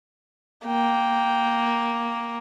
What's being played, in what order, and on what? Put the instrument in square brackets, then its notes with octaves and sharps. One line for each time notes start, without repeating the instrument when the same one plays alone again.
[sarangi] A#3 [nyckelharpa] G5